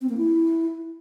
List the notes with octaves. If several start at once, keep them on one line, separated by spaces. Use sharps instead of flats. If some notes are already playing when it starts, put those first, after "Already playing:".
C4
A#3
E4